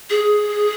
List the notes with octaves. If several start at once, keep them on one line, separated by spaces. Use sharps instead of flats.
G#4